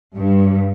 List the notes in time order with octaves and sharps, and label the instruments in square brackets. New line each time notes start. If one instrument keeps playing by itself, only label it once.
[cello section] G2